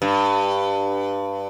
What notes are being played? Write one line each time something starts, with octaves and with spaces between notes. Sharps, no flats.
G2